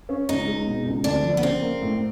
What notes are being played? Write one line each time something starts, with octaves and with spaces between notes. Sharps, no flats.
C#4
C#2 D#4
G#3
B2
C#2
D2 D4
F3
B3
C#3 C4
A#3
A2